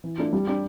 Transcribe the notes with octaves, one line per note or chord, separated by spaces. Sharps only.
E3
A3 D4 F4
G3
D4 G4